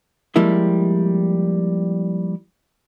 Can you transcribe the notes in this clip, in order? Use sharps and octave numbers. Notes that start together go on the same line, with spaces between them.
F3 G3 G#3 A#3 E4 E5